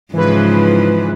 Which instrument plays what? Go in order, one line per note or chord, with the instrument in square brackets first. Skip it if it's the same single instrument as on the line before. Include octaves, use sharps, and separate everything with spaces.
[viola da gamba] G#2 C#3 F3 [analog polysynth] E3 B4